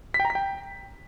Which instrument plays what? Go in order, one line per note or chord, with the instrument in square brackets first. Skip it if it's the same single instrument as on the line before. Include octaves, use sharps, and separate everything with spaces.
[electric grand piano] B6
G5
A#5
B6
G5